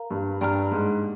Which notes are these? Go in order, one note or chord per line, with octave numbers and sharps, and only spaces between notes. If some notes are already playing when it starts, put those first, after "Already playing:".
Already playing: A#4 F5 A#5
G2
G2 D5 G5 A#5 F6
G#2